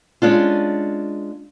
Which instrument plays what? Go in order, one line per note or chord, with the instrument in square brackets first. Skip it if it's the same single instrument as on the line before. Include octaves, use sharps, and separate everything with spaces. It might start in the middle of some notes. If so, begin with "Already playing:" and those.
[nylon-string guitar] G#3 C#4 D4 F4